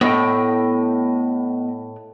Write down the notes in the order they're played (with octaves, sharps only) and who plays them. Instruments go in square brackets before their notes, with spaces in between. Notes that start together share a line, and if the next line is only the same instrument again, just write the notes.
[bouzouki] A2 [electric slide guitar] B3 D#5 G5